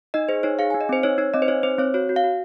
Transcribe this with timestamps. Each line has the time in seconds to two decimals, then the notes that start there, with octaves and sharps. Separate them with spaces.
0.14 D#4 D#5
0.29 G#4 C5
0.43 D#4 C#5
0.59 G#4 F5
0.70 D#4 G#5
0.81 D#5
0.89 C4 C5
1.03 D#4 C#5
1.18 D#4 C#5
1.34 C4 D#5
1.42 C5
1.48 D#4 C#5
1.63 C4 C5
1.78 C4 C#5
1.94 F#4 C#5
2.09 F#4
2.16 F5
2.24 F#4